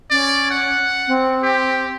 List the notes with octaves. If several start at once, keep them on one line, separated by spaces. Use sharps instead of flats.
C#4 D5
F#5
C4
G4